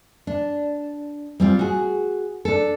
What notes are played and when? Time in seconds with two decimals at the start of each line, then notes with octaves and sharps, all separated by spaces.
0.27 D4
1.40 G3 C4 F4
1.59 F#4 G#4
2.45 D4 A4